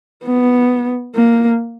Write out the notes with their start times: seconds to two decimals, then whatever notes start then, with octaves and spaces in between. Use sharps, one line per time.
0.24 B3
1.16 A#3